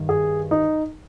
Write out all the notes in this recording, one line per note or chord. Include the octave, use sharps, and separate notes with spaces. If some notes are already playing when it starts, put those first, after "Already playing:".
Already playing: G2 D#3
G#4
D#4